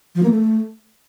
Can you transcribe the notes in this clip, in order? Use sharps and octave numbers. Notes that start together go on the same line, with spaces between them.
F3
A#3
A3